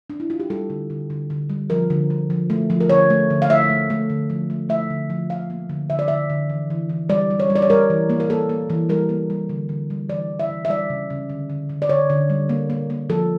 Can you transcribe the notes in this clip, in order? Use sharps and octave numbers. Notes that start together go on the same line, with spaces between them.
D4
E4
F4
G4
G3 A4
D3
D3
D3
D3
G3
F3 A#4
D3
D3
F3
A3
F3
A#4
D3 C#5
A3
D3
F5
A3 E5
A3
A3
D3
F3
A3
A3 E5
D3
F3
D3 F5
A#3
D3
D3 E5
D5
D3 E5
D3
E3
E3
E3
G3 D5
G3
C#5
G3
D5
C#5
G3 A#4
E3
A#3
A#4
A#3 A4
A#3
E3
G3 A#4
A#3
G3
D3
D3
G3
E3 D5
E3
E5
E3
E5
G3 D5
C#3
C#3
D3
D3
D3
D5
D3 C#5
D3
G3
A#3
A#3
A#3
F3 A4